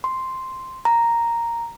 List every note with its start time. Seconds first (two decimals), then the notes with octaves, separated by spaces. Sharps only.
0.04 C6
0.85 A#5